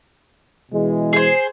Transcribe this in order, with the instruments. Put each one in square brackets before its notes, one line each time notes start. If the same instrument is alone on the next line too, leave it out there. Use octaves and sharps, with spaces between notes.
[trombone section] B2 E3 G#3
[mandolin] G#4 C5